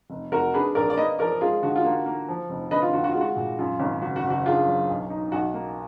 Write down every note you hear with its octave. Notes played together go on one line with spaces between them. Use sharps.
F1
F1 F#4 A#4
D4 G#4 B4
A#1 A#4 D5
D5
A#3 B4 D#5
F3 A#4 D5
G#3 F4 G#4
D3 F#4
F4
A#3 F#4
A#3
F3
F1
D3 B4 D#5
F4
D3 F#4
F#4
G#3 F4
F#4
A#2
F#2 F4
G#1
F#1 F#4
F#4
F#1
F#4
D4 F4 G#4
F#3
B1
D#4
B1 F#4
A#3